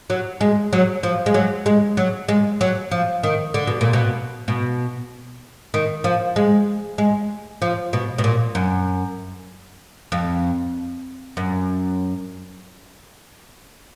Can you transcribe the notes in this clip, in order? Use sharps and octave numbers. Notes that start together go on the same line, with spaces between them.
F#3
G#3
F#3
F3
G#3
F#3
G#3
F#3
G#3
F#3
F3
D#3
D3
B2
A#2
B2
B2
D#3
F3
G#3
G#3
F3
B2
B2
A#2
F#2
F2
F#2